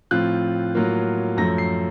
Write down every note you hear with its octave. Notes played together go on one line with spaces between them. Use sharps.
A2 F3 C4 F4 F#6
A2 F#3 A#3 F4
F#2 F3 A3 A#6
C7